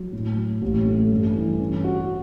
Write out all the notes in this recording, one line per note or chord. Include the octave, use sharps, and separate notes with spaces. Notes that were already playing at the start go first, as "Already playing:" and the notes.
Already playing: F#3
A2
F#3
A1
A3
G2
E3
C#4
F#4